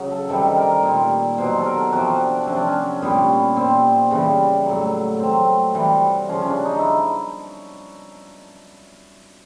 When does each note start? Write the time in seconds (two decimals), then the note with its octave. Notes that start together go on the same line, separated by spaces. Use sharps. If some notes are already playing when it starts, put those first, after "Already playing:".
Already playing: C#3 F#3
0.11 A4
0.29 C3 D#3 G3 A4
0.57 A#4
0.83 A#2 G3
1.38 B2 F#3 C5
1.58 A4
1.65 A#4
1.92 C3 F3 F#4
2.20 D4
2.47 C3 F3 C#4
2.56 D4
2.66 C#4
3.02 A#2 G3 B3
3.56 A#2 G3 C4
4.11 C#3 E3 G3
4.66 A2 F#3
5.19 A2 F#3 C4
5.74 C3 E3 G3
6.29 C#3 F3 C#4
6.41 C#4
6.48 D4
6.65 D#4
6.79 E4